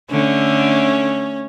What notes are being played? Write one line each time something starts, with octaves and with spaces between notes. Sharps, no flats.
D3 A3 C#4